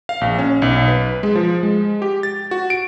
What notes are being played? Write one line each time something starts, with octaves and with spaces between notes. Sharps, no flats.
F5
A#1
C#4
B1
B4
G#3
F3
G#3
G4
A6
F#4
D7